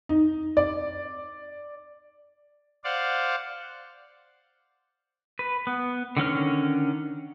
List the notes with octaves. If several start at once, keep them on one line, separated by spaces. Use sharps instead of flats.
D#4
D5
C5 D5 F5 F#5
B4
B3
D3 D#3 C#4 F6